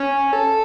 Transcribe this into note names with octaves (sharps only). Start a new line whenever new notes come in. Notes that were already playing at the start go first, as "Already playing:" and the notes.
Already playing: C#4
A4